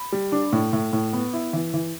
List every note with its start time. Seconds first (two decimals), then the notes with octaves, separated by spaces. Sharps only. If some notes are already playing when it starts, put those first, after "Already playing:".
Already playing: B5
0.12 G3
0.32 D4
0.53 A2
0.73 A2
0.93 A2
1.13 B3
1.33 E4
1.53 E3
1.74 E3